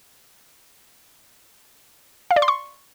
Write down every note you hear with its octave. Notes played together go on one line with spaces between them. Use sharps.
F5
D5
C6
C#6